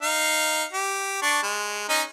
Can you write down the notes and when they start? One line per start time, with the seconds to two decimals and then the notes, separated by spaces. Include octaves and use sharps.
0.02 D#4 F5
0.73 G4
1.22 D4 C#6
1.43 G#3
1.89 C#4 D#4 D#5